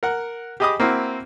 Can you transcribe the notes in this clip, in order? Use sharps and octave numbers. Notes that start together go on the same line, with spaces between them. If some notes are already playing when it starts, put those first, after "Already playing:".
A#4 F#5
G4 G#4 D#5 B5 D6 D#6
A#3 C4 E4 F#4